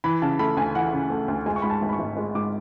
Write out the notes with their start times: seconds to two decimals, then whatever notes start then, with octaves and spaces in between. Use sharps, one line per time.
0.04 E3 B5
0.22 C#3 A5
0.39 A3 B5
0.57 D2 G#5
0.75 E3 F#5
0.93 C#3
1.10 A3
1.28 D2
1.46 G#3 G#5
1.56 C#6
1.62 G#2 B5
1.70 A5
1.82 G#1
1.89 B5
1.93 C#6
1.99 G#1
2.17 G#3
2.35 G#2 D6